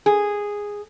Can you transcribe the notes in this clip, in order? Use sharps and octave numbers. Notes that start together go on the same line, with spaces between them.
G#4